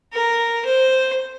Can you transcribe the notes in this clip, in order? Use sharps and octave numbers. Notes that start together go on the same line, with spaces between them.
A#4
C5